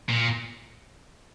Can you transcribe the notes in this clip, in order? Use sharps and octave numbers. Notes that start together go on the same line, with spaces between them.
A#2